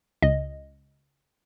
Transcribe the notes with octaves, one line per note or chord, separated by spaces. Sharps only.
C#2 D#5